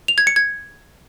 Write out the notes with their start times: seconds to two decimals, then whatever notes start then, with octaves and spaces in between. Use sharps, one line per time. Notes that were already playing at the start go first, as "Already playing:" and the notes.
0.08 F7
0.18 G#6
0.27 C#7
0.36 G#6